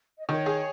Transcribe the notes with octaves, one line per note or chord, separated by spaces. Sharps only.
D#5
D#3 C#5
G#4